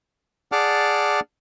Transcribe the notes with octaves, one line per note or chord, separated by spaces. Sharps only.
G#4 D5 F#5 A5 D6 F6